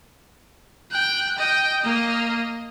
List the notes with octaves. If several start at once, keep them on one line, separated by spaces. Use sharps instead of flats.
G5 F#6
D#5 G5
A#3 D#5